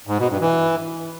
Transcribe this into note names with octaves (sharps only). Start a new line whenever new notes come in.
G#2
B2
G2
E3